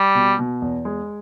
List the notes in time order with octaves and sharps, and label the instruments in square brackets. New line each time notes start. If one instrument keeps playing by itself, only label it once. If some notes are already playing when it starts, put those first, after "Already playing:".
Already playing: [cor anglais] G3
[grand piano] B2
B2
E2
G#3